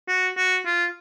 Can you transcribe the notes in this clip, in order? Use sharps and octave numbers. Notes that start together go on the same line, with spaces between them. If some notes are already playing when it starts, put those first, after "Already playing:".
F#4
F#4
F4